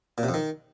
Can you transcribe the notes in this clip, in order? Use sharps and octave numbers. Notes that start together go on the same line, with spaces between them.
A#2
C3
F2
D#3